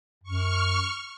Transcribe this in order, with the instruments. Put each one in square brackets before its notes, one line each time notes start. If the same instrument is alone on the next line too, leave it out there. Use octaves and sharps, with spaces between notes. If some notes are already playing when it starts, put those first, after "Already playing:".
[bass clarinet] F#2 [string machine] C#6 F6